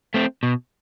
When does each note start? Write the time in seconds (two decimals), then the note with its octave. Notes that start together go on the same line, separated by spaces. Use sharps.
0.14 A3 C4
0.43 B2